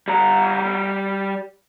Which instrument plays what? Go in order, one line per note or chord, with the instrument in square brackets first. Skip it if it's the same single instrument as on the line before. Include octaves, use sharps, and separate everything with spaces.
[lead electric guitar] G3 A#5